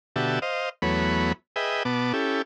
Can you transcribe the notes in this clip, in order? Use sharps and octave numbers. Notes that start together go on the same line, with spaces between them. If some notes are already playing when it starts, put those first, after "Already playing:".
B2 D3 F#4 G4 E5 A5
C5 D#5 F5
E2 F#3 A3 B3 C#5 B5
G#4 B4 D#5 E5 G5
B2 B3 A5 D6
C#4 E4 G4 A4